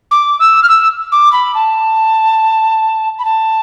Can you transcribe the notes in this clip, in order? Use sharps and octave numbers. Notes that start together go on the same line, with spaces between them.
D6
E6
F6
E6
D6
B5
A5
B5
A5